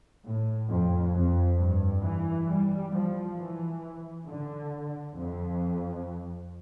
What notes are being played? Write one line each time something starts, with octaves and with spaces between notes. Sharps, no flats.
A2
F2
F2
G2
E3
G3
F3
E3
D3
F2